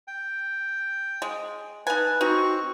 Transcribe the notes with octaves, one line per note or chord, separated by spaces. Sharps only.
G5
G#3
D#4 B4 G#5 A5
C4 D#4 F#4 C#6